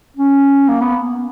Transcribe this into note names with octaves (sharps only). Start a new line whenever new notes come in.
C#4
A#3
B3